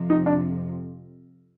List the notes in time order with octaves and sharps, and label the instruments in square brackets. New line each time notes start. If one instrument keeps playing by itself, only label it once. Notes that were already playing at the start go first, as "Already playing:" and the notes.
Already playing: [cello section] F2 C3 F3
[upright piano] D#4
D4